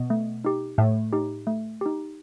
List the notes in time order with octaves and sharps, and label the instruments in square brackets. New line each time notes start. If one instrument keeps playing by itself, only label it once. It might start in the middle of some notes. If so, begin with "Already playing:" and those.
Already playing: [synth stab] B2
[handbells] A3
D#4 G4
[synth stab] A2 [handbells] A3
[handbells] D#4 G4
A3
D#4 G4